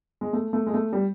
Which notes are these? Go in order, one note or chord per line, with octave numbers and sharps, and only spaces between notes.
G#3
A3
A3
G#3
A3
G3